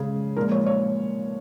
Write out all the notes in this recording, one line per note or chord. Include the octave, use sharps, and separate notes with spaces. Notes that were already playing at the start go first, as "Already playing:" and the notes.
Already playing: C#3 G#3 G#4
A#2 F3 G#3 A#4
C#5
C#5